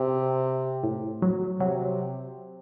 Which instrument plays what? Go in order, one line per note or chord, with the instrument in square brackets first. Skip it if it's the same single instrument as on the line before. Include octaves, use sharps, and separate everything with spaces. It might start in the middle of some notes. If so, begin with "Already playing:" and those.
Already playing: [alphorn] C3
[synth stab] A2
F#3
[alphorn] C3 [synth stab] F#3